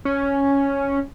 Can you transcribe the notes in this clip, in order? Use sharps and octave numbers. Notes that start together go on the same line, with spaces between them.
C#4